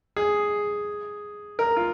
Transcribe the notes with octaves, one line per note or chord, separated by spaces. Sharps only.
G#4
A#4
F4